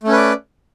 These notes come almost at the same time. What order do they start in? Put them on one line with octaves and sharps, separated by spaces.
A3 C#4 B4 D5